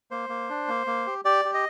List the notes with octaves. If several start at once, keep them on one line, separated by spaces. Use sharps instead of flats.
A#3 C5
A#3
D4
A#3
A#3
G4
G4 D5
G4
D#5